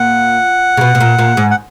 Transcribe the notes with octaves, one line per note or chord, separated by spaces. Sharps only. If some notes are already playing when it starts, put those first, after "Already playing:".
Already playing: A#2 F#5
C#3
B2
B2
A#2
A#2
G#2
F#5